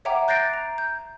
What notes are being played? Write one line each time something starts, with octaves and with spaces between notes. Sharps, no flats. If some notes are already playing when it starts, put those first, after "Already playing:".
C#5 E5 F#5 G5 A#5 D6
F#6 G6 A6 A#6 C7 D7
A#5
G6